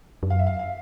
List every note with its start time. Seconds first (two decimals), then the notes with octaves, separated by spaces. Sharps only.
0.23 F#2
0.30 F5
0.39 E5
0.47 F5
0.59 F5